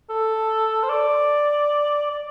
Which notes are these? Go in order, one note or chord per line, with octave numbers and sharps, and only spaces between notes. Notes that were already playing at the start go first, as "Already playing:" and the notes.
A4
C5
D5
D5